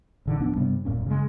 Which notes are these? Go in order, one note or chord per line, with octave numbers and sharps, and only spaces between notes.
A1 D3 D#3
D1 F2 B3 D4
G2 C3 G3 B3
D#1 F#2 A#2 C#4
C#3 G3 G#3